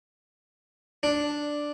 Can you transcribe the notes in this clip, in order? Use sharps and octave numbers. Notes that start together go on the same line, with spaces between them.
D4